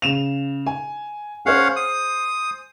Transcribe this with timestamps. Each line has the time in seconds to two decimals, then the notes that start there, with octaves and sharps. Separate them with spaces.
0.02 C#3 E7 F7
0.66 G#5
1.46 C#4 G#4 C5 F5 F#5
1.76 D#6